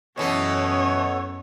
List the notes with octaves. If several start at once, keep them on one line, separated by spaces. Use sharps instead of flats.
F#2 B2 E3 A3 B3 C#4 A4 C#5